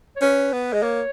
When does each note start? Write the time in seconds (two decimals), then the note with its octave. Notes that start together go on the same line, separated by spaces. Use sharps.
0.16 C#5
0.21 C#4 B4
0.53 B3
0.73 G#3 D#5
0.83 A#3 C#5